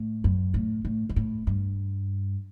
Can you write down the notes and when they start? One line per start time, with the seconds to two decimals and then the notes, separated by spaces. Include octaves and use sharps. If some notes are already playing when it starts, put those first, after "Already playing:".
Already playing: A2
0.24 F#2
0.54 A2
0.85 A2
1.09 G2
1.16 A2
1.47 G2